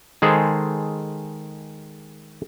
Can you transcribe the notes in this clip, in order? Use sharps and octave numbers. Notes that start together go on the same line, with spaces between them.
D#3 G#3 G#4 A4 C5